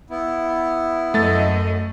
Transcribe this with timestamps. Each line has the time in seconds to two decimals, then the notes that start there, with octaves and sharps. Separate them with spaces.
0.10 B3 E4
1.14 F#2 A3 D#5 A6